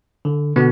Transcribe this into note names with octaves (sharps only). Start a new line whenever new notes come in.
D3
B2 D3 B3